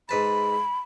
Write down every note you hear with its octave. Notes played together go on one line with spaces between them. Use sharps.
G#2 B4 A5 B5